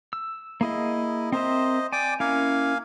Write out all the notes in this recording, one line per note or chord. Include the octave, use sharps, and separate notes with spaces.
E6
A#3 E4 G#4 D#5
C4 A#4 C5 D#5 E5
D5 G5 G#5 D6
A#3 C#4 E4 A#4 F5 G#5